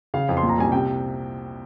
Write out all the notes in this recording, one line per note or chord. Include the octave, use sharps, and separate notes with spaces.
C#3 F5
F2
C6
A#2
A#5
C2 G#5
C3 G5